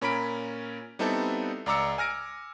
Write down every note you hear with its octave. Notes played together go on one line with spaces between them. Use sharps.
A#2 C#4 A#4 B5 B6 D7
G3 B3 C4 D#4 E4 A4
C#2 D5 A#5 D6 E6 C#7
G#5 F6 A#6 D7